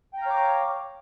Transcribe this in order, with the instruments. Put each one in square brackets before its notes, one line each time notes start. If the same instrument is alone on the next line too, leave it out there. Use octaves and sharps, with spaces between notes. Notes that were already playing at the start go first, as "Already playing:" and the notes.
[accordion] G5
A#5
F5
C#5
D6